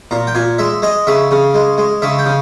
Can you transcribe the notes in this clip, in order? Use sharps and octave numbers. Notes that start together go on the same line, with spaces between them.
A#2 A#5
G5
A#2 G#5
G#3 E5
G#3 D#5
C#3 E5
C#3
G#3
G#3
C#3 E5
G5
C#3